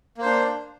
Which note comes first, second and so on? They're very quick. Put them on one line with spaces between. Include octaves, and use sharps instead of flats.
A#3 C5 D4